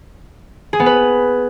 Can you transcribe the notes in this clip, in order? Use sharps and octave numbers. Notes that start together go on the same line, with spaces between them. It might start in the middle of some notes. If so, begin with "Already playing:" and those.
G#4
B3
B4